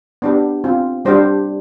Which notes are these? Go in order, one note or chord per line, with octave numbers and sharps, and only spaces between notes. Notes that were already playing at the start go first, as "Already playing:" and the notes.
B3 D4 G4
C4 F4
G3 D4 G4 C5